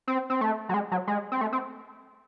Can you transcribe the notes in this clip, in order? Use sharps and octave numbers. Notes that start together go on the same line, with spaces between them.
C4
C4
A3
F#3
G#3
F#3
G#3
C4
A3
C4